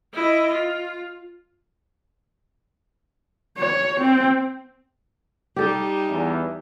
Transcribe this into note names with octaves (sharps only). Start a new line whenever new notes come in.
E4 D#5
F4
C#5
C4
G3 D#4 G4 A4
E2